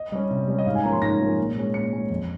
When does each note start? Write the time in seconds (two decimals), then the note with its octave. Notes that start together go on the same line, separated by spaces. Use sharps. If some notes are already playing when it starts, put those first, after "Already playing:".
Already playing: D#5
0.12 G3 C#4
0.30 C3
0.48 G3 C#4
0.59 D#5
0.66 G#2 F5
0.75 G#5
0.84 F3 A#3 C#4 A#5
0.93 C6
1.02 G#2 A#6
1.20 F3 A#3 C#4
1.38 A#2
1.56 G#3 C#4
1.74 A#2 C#7
1.92 G#3 C#4
2.10 F2